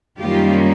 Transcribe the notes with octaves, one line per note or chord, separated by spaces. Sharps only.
F#2 D#3 G3 A#3 C#4 F4 G4